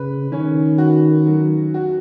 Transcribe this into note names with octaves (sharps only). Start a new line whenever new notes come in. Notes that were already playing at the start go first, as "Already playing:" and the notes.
Already playing: C#3 B4
D#3 C#4
F#4
F#3
F#4